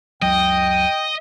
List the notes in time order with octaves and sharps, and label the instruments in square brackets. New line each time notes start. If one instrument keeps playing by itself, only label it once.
[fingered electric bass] F#1 C#2 F#3 [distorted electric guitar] D#5 [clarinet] G5